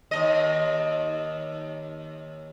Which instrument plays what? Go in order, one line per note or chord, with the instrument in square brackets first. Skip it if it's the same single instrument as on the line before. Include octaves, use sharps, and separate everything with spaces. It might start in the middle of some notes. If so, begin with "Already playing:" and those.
[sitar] D#2 D#5